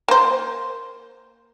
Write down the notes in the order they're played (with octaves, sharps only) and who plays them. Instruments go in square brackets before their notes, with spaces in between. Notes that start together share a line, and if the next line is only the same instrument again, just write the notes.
[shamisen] A#3 C5